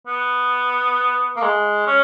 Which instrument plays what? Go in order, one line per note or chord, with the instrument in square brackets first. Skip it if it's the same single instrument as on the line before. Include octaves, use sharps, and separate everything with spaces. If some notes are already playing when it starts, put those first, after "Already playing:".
[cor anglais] B3
A#3
G#3
C#4